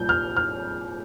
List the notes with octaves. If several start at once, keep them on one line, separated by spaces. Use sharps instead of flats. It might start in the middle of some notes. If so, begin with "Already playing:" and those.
Already playing: C2 A#2 F3 G6
F6
F6